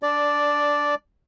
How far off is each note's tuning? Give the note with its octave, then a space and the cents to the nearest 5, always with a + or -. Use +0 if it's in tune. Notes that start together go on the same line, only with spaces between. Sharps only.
D4 -15 D5 +0